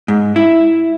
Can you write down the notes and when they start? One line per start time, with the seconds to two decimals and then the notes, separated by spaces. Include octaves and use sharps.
0.08 G#2
0.36 E4